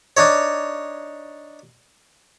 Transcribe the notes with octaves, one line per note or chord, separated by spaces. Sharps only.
D4 D#4 C#5